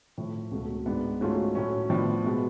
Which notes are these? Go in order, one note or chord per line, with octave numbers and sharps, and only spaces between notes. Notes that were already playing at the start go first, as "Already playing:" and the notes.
A2 F3 A3
C#2 B2 F#3 A3
G#2 G#3 B3 D4
G#2 F#3 A3 C#4 F4
A2 F#3 A3 C#4
A2 F3 B3 D4
B2 G#3 B3